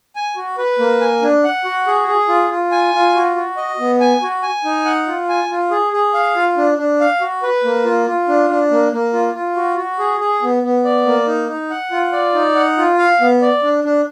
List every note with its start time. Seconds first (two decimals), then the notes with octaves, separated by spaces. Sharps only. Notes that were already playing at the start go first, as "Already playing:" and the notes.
0.16 G#5
0.36 F#4
0.57 B4
0.79 A#3
1.01 G#5
1.22 D4
1.44 F#5
1.65 F#4
1.87 G#4
2.08 G#4
2.29 F4
2.50 F4
2.71 G#5
2.94 F4
3.15 F#4
3.36 F#4
3.57 D#5
3.79 B3
4.00 G#5
4.22 F#4
4.43 G#5
4.65 D#4
4.85 F#5
5.07 F4
5.29 G#5
5.51 F4
5.71 G#4
5.93 G#4
6.14 F5
6.36 F4
6.57 D4
6.78 D4
7.00 F5
7.21 F#4
7.43 B4
7.64 A#3
7.85 F4
8.06 F4
8.28 D4
8.50 D4
8.71 A#3
8.93 A#3
9.13 F4
9.35 F4
9.56 F#4
9.77 F#4
9.99 G#4
10.20 G#4
10.42 B3
10.63 B3
10.84 D5
11.06 A#3
11.27 D#4
11.49 D#4
11.70 F#5
11.91 F4
12.12 D5
12.34 D#4
12.55 F#5
12.78 F4
12.98 F5
13.21 B3
13.42 D5
13.63 D4
13.84 D4